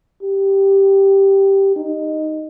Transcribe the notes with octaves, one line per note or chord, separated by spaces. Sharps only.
G4
D#4